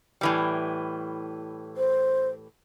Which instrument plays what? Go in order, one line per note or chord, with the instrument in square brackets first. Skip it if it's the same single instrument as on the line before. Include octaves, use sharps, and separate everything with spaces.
[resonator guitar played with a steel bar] A2 E3 G3
[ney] C5